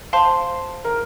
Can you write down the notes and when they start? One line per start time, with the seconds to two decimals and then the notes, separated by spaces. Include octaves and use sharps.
0.13 C5 F5 A5 C6
0.85 A#4